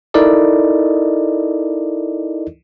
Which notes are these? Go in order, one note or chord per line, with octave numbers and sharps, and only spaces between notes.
D#4 E4 A4 A#4 D5 D#5